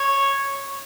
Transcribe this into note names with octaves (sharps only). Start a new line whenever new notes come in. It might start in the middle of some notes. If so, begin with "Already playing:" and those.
Already playing: C#5